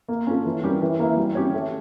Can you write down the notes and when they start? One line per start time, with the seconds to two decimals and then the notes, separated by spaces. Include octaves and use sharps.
0.08 A#3
0.27 C#4 F4 A4
0.45 E3
0.64 G3 C#4 G4 A#4
0.82 E3
0.99 A#3 E4
1.17 G3
1.35 C#4 G4 C#5
1.54 A3